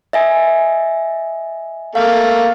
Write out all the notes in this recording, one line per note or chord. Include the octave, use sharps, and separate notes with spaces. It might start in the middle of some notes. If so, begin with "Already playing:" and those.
D#5 E5 G#5
A3 A#3 F5